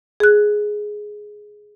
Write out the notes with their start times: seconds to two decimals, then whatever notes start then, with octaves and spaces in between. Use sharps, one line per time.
0.20 G#4 F#6